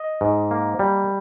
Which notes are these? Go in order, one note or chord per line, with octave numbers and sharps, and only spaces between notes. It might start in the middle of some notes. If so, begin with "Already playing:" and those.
Already playing: D#5
G#2
A#3
G3